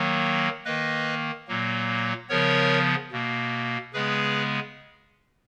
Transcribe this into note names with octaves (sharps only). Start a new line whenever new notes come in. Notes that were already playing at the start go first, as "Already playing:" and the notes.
Already playing: D#3 F#3 A#3
D#3 A#3 B4 D#5
A#2 F#3 A#3
C#3 F3 B3 A#4 C#5
B2 A#3
C#3 G#3 B3 G#4 B4